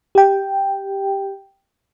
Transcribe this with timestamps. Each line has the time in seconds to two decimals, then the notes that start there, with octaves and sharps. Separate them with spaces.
0.15 G4 G5